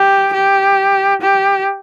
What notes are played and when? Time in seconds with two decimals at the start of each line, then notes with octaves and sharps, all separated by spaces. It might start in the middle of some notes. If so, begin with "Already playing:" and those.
Already playing: G4
0.34 G4
1.22 G4